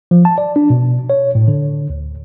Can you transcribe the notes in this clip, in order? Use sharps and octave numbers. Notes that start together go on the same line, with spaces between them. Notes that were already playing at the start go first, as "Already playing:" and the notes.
F3
A5
D5
D4
B2
C#5
A2
D3
D2